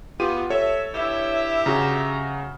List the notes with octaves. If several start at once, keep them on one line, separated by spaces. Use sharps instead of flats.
B3 F4 G4 D#7
A4 C#5 E5
G2 E4 G4 E5
C#3 F#4 A#5